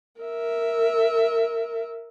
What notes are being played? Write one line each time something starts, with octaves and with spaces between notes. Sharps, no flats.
A#4 E5